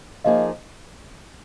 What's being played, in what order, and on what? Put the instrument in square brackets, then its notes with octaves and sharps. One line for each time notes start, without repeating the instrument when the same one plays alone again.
[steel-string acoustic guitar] F3 A#3 D#4 G#4 [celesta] D#5 F5